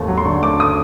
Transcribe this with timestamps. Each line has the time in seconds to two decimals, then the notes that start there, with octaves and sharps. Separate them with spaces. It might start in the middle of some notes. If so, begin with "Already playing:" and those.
Already playing: G#1 D#2 A3
0.08 F#3
0.18 C6
0.25 D3 C#6
0.43 A3 D6
0.60 D#6